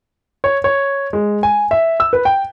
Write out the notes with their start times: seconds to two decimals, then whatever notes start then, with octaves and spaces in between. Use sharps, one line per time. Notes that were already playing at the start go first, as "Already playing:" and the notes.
0.44 C#5
0.64 C#5
1.13 G#3
1.43 G#5
1.71 E5
2.00 E6
2.13 B4
2.25 G5